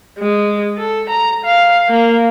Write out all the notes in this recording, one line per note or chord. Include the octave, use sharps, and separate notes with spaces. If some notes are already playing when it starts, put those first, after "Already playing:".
G#3
A4
A#5
F5
A#3